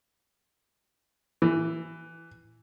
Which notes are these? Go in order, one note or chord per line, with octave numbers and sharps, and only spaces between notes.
E3